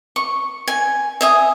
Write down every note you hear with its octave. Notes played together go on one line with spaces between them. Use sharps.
C#6
G#5
E5 G#5 D#6